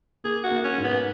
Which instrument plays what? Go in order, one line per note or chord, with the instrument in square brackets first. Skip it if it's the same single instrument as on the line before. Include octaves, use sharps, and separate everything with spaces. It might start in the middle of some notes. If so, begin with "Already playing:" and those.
[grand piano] A#3 [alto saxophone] G#4
[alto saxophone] F#4
[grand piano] A#3
[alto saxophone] C#4
[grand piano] G#2
[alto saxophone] B3